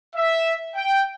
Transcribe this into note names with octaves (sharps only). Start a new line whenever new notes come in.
E5
G5